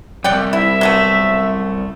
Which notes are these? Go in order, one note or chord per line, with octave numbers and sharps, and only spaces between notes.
C2 F#2 D5 F#5 G5
E4 E5
F#3 A3 B3